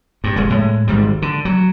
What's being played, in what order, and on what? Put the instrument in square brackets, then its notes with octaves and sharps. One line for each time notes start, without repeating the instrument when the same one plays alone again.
[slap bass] G2
F1 G#3
A2 G#3
G#1 G#2 G3
D3
F#3